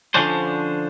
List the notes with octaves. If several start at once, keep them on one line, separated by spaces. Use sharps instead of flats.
D3 F3 C#4 D4 C5